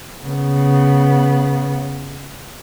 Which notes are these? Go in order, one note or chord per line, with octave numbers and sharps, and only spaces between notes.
C#3 B3